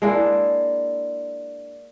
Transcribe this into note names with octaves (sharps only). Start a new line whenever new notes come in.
G#3 A#3 D4 E4